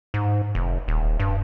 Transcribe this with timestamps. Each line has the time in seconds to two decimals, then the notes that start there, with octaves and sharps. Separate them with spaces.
0.14 G#2
0.55 F1
0.88 D#1
1.20 G2